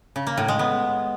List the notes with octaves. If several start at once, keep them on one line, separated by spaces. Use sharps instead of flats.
C#3
A#3
A2
G#3
B3